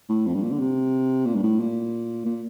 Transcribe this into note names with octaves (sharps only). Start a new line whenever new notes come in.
A2
F2
G2
A#2
D3
C3
A#2
G2
A2
A#2
A#2